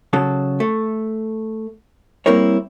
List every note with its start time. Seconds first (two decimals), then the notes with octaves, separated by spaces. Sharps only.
0.13 C#3 F#3 A4
0.60 A3
2.26 G3 A#3 C4 E4 A#4 C#5